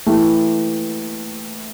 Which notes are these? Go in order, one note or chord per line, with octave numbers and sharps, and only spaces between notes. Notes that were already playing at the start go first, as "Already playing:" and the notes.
E3 A3 E4 G4